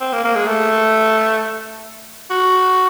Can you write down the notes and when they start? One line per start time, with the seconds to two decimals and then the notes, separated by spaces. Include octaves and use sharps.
0.01 C4
0.13 A#3
0.24 A#3
0.35 G#3
0.47 A3
2.30 F#4